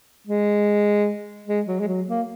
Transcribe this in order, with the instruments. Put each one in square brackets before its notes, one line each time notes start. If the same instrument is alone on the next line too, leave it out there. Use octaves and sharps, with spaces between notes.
[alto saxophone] G#3
G#3
F#3
G#3
F#3
A#3